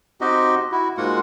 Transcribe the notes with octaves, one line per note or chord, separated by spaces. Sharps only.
C4 D#4 F#4 G4 D#5
E4 F#4
G#2 G#3 A#3 F4 F#4 F#5